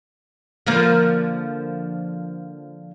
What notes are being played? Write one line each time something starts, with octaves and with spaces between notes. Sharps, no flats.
D3 F3 A#3